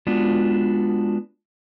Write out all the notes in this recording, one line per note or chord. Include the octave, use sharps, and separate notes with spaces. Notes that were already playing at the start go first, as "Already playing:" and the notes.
G#3 B3 D4 F4 F#4